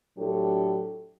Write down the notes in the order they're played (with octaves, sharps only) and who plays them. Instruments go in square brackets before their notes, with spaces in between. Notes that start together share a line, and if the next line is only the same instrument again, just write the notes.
[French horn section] A2 F#3 D4 G4 A4